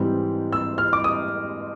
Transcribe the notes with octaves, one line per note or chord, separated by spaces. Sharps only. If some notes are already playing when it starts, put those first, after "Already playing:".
Already playing: G#2 E3 G3 C4
E6
F6
D6
D#6